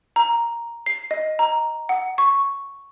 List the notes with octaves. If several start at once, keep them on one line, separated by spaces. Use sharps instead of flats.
A#5
C7
D#5
A#5
F#5
C#6